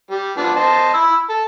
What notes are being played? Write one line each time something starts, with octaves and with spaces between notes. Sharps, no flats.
G3
F3 B3 D4
C5 D#5 A5
B5 E6
A4